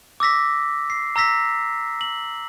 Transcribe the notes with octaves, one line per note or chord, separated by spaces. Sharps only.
D6 E6 A#6 B6
C7
A#5 E6 A#6 B6
F#7